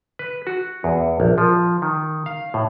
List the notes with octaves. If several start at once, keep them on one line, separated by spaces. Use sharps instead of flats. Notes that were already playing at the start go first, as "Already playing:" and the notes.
B4
F#4
E2
A#1
F3
D#3
F5
A2